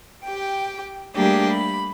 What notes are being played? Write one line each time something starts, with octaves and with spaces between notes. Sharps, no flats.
G4 G5
G3 A3 A#3 D4 G4 G#4
B5